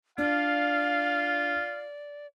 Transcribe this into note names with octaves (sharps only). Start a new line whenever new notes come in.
D4 F4 D5 F5